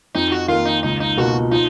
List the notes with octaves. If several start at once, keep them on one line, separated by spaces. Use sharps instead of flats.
F2 D#4
F#4
D#3 A#3 F4
D#4
C#2 D#4
D#4
B2 A#3 F4 F#4
F3 D#4